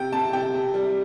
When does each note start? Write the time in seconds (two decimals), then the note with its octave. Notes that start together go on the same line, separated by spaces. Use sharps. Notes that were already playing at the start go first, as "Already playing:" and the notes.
Already playing: C3 G5
0.12 C3 A5
0.33 C3 G5
0.54 C3
0.74 G3